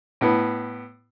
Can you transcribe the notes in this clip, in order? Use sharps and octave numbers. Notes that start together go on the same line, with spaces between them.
A2 B3